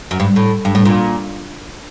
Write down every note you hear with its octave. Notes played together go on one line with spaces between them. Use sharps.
F#2
G2
A2
G2
A2
A#2